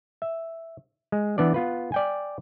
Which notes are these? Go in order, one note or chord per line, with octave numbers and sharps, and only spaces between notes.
E5
G#3
E3 B3 D4 D5
B3 F4 B4
D5 G5 G#5